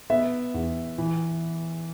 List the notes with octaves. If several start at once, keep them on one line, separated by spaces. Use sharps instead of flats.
B3 E5
E2
E3